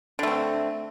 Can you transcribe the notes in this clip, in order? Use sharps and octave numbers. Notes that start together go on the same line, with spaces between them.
D3 A3 C4